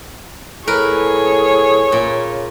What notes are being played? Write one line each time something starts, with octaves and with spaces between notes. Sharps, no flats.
A2 G#4 A#4 B4 C#5
A#2 C#3